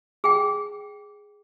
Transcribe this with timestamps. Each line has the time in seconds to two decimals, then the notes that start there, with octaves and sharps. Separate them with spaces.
0.24 G#4 G5